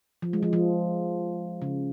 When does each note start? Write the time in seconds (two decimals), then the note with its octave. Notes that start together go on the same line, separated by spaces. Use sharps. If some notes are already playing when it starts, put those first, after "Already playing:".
0.22 F3
0.33 G#3
0.43 F3
0.53 F3
1.62 C#3